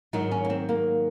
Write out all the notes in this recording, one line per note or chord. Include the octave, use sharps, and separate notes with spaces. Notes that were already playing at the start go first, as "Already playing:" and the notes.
G#2 D#3 F#3 D#4
C#4
A#3
C4
A#3